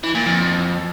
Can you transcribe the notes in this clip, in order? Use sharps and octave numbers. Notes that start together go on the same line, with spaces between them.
E3
A#2
F2